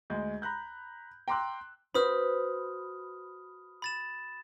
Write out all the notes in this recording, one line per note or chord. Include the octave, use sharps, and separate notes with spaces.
D2 G#3 G6
A#5 B5 F#6 G6
G5 A#5 C6 D6 E6 F#6
F#4 B4 C5 B5 D#6 F6
B5 A6 E7